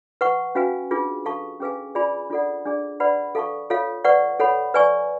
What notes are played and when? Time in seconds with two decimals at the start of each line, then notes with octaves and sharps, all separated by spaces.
0.21 B4 F#5 C#6
0.55 C#4 F#4 B4 F5 G#5
0.91 D4 F4 G#4 B4
1.25 A4 F5 A5 C#6
1.60 C#4 G#4 B4 F5 G#5
1.95 F4 G#4 D5 G#5 B5
2.30 D4 F4 A4 D5 F#5
2.66 D4 G#4 D5
3.00 B4 D5 F#5 B5
3.35 A4 F5 A5 C#6
3.70 F4 A4 C#5 F5
4.04 B4 D5 F#5 C#6
4.40 A4 C#5 F#5 B5
4.74 B4 D5 G#5 C#6